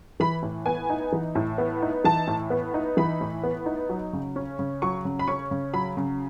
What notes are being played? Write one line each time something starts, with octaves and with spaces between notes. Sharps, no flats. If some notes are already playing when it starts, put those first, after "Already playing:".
E3 B5
A2
B3 G#5
D#4
E3
A2
B3
D#4
E3 A5
A2
B3
D#4
E3 B5
A2
B3
D#4
F#3
C#3
C#4
C#3
F#3 C#6
C#3
B5
C#4 C#6
C#3
F#3 B5
C#3